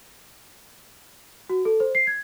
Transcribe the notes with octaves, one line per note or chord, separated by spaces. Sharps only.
F#4
A4
C5
C7
G#6